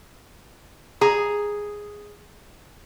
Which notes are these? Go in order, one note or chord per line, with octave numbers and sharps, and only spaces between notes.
G#4 A#5